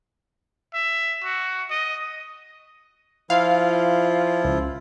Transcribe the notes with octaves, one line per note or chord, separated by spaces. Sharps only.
E5
F#4
D#5
F3 E4 F4 F5
C#2